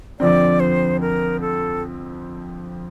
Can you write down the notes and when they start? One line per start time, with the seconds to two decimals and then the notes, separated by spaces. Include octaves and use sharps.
0.20 F2 D3 F3 C4 D5
0.60 C5
1.00 A#4
1.40 A4